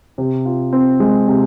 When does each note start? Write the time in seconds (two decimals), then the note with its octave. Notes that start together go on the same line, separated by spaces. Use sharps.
0.18 C3
0.45 F4
0.73 C4
1.00 G#3
1.28 C3